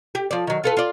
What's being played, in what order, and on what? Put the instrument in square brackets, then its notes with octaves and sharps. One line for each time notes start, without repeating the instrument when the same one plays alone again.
[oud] G4
F3 D5
D#3 F#3
F4 A4 B4
F4 D5